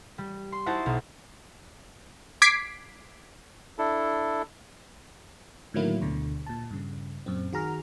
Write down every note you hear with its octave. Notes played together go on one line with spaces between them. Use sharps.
G3
C6
D#4 E4 F#4 C5 A5
B1
D6 G#6 B6 C7 D7
D4 E4 A4
A2 D3 D#3 F#3 A#3 E4
D2 B2 D3
A#2 A5
G2 C#3
F#2 A#2 C4
D#3 F#4 G#4 A#5 F6